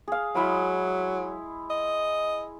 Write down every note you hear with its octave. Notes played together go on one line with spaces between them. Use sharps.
G#4 F5
F#3 G#3 E4 B5
D#5